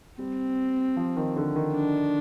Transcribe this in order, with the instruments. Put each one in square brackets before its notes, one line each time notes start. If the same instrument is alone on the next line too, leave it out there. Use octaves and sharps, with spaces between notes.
[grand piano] G3 [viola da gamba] C4
[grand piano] F3
D#3
D3
D#3
[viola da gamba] D4